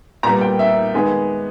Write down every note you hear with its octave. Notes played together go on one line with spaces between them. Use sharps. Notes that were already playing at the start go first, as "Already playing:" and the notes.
A#2 G3 B3 A#5
G5
E5
D#3 G#3 B3